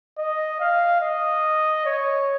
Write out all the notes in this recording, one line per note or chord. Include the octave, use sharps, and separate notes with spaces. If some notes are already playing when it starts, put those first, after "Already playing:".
D#5
F5
D#5
C#5